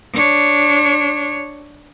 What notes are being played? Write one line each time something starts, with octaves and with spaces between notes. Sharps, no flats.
D4 C#5